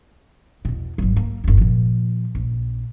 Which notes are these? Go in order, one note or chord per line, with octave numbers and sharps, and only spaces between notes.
E2 B2
G#1 F#3
A#3
G1 D#2
A#2 F3
A#1